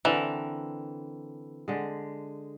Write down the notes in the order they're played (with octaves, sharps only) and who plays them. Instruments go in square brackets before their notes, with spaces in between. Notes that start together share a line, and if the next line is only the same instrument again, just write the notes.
[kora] D3 C4 A#4 [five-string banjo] E3
[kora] D3 G#3